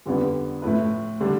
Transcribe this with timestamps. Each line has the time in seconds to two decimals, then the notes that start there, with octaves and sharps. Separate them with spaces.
0.06 F2 D3 G3 B3 F4
0.62 A2 F3 A3 E4 B4
1.20 D3 G3 D4